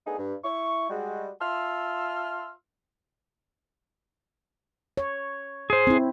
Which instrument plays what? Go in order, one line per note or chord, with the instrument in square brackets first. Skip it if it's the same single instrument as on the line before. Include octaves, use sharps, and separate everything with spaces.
[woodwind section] A3 B3 D4 D#4 G#4
G2
E4 C#6
G3 G#3 F#4
F4 E5 A5 C6 E6 F6
[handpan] C#5
[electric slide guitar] G#4 C5
[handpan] C4 E4